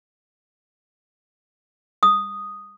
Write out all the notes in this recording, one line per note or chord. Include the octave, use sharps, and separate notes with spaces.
D#6